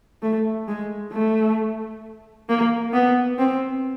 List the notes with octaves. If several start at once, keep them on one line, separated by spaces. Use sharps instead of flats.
A3
G#3
A3
A#3
B3
C4